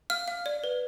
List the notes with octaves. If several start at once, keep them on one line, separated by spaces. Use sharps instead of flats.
F5 F6
F5
D5
B4